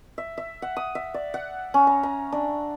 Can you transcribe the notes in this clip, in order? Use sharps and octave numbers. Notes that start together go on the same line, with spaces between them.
E5
E5
F#5
D#6
E5
D5
F#5
C#4
A#5
A#5
D4